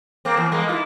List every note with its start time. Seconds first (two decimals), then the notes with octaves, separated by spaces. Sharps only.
0.25 A#3 C4
0.37 E2
0.52 G#3 A#3 B3
0.69 E4 F4